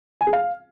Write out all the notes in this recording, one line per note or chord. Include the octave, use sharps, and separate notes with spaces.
G#5
G#4
F5